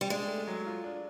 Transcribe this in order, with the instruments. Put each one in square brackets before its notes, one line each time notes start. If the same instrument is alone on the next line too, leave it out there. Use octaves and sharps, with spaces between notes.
[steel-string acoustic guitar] G3
[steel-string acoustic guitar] G#3 [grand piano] D4
[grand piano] A3
F#3
F4
D4